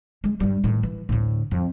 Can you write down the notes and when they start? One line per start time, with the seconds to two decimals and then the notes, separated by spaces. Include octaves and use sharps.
0.24 G#3
0.40 G2 G3
0.64 A2 D#3
0.83 E3
1.09 D2 A2
1.51 F2